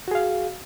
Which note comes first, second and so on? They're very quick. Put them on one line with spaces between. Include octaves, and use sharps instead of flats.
F#4 G#4 F5